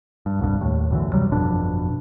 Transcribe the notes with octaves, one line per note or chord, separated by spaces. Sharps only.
G2
D1 C2 G2
D#2 A2
B1 F#2 D3 E3
D2 C3 F#3 G3
G1 F2 B2 D4